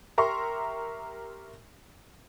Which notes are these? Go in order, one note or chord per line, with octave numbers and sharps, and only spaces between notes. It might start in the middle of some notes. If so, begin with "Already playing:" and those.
G4 A#4 E5 A#5 C6 C#6